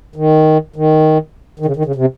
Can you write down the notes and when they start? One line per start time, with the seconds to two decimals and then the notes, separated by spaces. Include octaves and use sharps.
0.16 D#3
0.76 D#3
1.59 D#3
1.66 C#3
1.76 D#3
1.85 C#3
1.95 C3